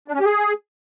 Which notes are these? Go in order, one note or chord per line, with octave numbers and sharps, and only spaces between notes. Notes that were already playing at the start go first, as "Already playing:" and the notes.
D4
C#4
G4
G#4